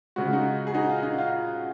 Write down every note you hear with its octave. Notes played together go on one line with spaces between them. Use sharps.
C#3 G#3 F#4
F4
D#4 F#4
G#4
D#4 F#4
F4
D#4
F4